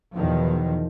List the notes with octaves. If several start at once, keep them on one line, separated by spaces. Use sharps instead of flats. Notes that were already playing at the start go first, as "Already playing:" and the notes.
E2 B2 D#3 F3